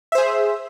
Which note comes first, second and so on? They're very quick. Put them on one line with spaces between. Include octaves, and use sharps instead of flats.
E5 C5 G#4